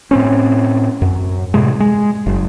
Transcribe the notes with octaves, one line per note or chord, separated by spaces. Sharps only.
A2 C4 C#4
F#2
A2 C3 G#3
G#3
F#1